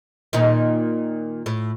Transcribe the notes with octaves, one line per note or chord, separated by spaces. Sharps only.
A#2 D#3 D#4
A2